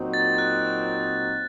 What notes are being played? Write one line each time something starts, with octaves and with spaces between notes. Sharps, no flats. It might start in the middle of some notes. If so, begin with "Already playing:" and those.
Already playing: A#2 F#3 C4 D#4 F#4
A6
F#6